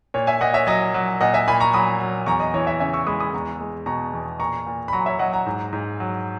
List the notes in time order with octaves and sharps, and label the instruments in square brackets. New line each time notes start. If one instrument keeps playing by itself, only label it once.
[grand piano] A#2 C#5
E5 G#5
A#2 D#5 F#5
C#5 E5
F#3 D#5
F#3
A#2 D#5 F#5
E5 G#5
A#2 G#5 B5
A#5 C#6
F#3 B5 D#6
F#3
E2 A#5 C#6
D#5
E3 C#5
E5 G#5
C#3 E5 G#5
C#6 E6
G#3 B5 D#6
B5 D#6
E2 A#5 C#6
G#3
B2 A#5 C#6
E2
A#2 A#5 C#6
A#2
B5
F#3 A#5 C#6
C#5 E5
F#3 D#5 F#5
F#5 A#5
G#2
G#2
F#3